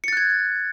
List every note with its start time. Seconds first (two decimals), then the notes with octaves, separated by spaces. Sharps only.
0.04 C#7
0.08 A6
0.13 F#6
0.17 G#6